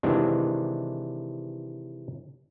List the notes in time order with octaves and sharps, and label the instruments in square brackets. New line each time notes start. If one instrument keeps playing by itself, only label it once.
[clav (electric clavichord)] C3 D#3 E3 G#3 D4